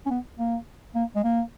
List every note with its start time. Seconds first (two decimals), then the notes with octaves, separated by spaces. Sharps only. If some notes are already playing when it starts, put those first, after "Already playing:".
0.06 C#4
0.10 B3
0.39 A#3
0.95 A#3
1.16 G#3
1.24 A#3